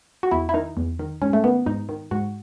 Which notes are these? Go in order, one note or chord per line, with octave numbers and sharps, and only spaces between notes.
F#4
E2 E4
E4
D#3 D#4
E2
D#3
G#2 C#4
A3
D#3 B3
G#2 D#4
D#3
G#2 F#4